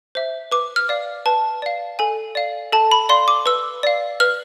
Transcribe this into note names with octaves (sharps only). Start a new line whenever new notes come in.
C5 E5
B4 D6
F6
D5 F5
B4 A5
D5 F5
A4 G#5
D5 F5
A4 A5
B5
D5 F5 C6
D6
B4 E6
D5 F5
B4 F6